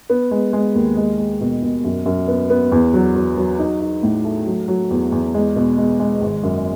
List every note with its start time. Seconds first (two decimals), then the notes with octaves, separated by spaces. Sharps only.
0.10 B3
0.31 G#3
0.53 G#3
0.75 D#2
0.97 G#3
1.19 G#3
1.41 B2
1.62 B2
1.84 F#2
2.06 F#2
2.28 B3
2.50 B3
2.72 E2
2.94 F#3
3.16 F#3
3.37 F#3
3.59 D#4
3.81 D#4
4.03 A2
4.25 A3
4.46 F#3
4.68 F#3
4.90 E2
5.12 E2
5.34 G#3
5.56 B2
5.78 G#3
6.00 G#3
6.21 G#1
6.43 F#2